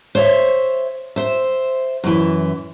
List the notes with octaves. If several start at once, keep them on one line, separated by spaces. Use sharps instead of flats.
C5 C#5 E5
C5 E5
F#2 E3